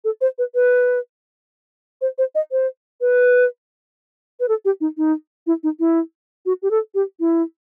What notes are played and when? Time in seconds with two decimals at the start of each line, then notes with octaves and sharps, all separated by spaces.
0.04 A4
0.21 C5
0.38 B4
0.55 B4
2.01 C5
2.18 C5
2.35 D#5
2.52 C5
3.01 B4
4.40 B4
4.48 A4
4.65 G4
4.81 D#4
4.97 D#4
5.47 E4
5.63 D#4
5.80 E4
6.46 F#4
6.62 G4
6.71 A4
6.95 G4
7.20 E4